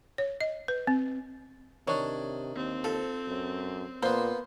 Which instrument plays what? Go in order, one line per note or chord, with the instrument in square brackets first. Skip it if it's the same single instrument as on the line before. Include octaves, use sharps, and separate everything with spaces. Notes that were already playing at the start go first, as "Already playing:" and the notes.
[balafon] C#5
D#5
B4
C4
[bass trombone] C3 [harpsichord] D#3 D4 [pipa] C#5
[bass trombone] D#2 [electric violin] C4
[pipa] F3 [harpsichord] A4
[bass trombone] F#2
[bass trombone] A#2 [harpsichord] A#3 B3 [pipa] C5